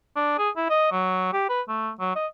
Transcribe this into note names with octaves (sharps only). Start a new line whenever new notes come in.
D4
G#4
E4
D#5
F#3
G4
B4
A3
F#3
D#5